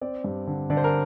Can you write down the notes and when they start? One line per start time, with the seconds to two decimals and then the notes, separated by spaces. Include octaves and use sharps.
0.01 C4 D5
0.24 G2
0.47 D3
0.70 D3 D5
0.77 C5
0.84 A#4